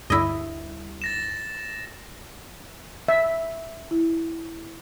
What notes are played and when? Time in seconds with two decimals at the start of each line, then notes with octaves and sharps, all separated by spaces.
0.10 D2 G2 E4 D#5
1.02 A6 A#6 E7
3.08 E5
3.91 E4